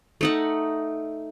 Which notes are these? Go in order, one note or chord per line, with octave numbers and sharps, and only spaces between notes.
A3 D#4 F#5